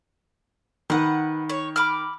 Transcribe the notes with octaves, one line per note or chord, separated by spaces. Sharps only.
D#3 B4 F#5
C#5
B5 D6 F6